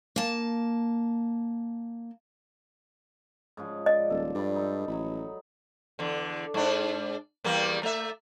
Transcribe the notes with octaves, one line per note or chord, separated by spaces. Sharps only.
A#3 A5
G#2 C#3 F3
D5 D#5
D#1 A4
G2 D5 B5
D#4 A4
A1 F#3 B5
E2 D3
G#2 D4
E2 G3 A#3
A3 E5